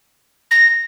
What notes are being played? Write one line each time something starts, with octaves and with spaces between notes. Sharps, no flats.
A#6